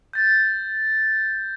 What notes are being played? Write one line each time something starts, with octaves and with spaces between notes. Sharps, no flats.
G6 A6